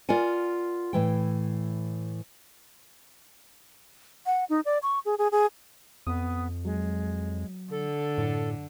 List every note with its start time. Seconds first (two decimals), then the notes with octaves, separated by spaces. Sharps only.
0.09 F4 A#4 D5 F#5 G#5
0.93 A2 E3 G5
4.26 F#5
4.50 D#4
4.65 D5
4.83 C#6
5.05 G#4
5.19 G#4
5.32 G#4
6.07 F2 B3 D#6
6.65 F#3 G#3
7.71 D3 A4
8.18 F#2 A2